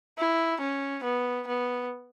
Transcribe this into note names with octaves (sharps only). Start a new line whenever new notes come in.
E4
C#4
B3
B3